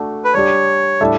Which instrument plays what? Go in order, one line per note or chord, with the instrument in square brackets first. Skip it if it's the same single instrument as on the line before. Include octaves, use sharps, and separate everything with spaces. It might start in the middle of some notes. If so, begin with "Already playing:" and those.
Already playing: [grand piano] A3 D4 F#4
[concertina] B4
[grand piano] G3 D4 G4 [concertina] C#5
[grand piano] A2 G3 D4 A4 E5